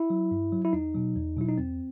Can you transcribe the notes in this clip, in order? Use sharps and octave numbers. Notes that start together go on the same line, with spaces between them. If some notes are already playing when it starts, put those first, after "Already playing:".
Already playing: E4
F#3
G2
F#3
E4
E2 D#4
B2 F#3
E2
B2 F#3 E4
D#4
E2 C4